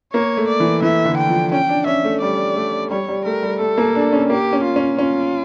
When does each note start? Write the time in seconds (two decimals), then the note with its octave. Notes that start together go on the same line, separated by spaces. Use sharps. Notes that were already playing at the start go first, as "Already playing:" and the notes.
0.13 A#3 C#5
0.37 A3
0.48 D5
0.60 E3
0.82 E3 E5
1.05 D3
1.18 G5
1.29 F3
1.52 C#4 G5
1.69 D4
1.86 C#4 E5
2.04 A3
2.21 G3 D5
2.56 A3
2.91 G3 C#5
3.08 G3
3.25 A3 A#4
3.43 G3
3.60 A3 A4
3.78 A#3
3.95 D4
4.12 C#4
4.29 A#3 G4
4.53 C#4
4.64 F4
4.76 C#4
4.98 C#4 F4